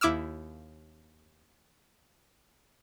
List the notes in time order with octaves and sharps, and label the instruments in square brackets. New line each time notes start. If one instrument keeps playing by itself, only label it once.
[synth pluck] D#2 E4 D6 E6 F6